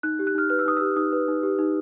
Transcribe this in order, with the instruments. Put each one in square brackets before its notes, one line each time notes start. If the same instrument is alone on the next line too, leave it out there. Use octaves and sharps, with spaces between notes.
[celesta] D#4 F#6
G4
F#6
D#4 F6
B4 F6
E6
D#4 D#6
G4 E6
D#4 D#6
B4
D#4
G4
D#4